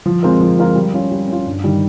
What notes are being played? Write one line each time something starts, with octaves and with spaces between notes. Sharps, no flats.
F3
G#3 C4 F4 A#4
F3
G#3 C4 F4 A#4
G3
C#4 F4
G3
C#4 F4
G2
D#3 G3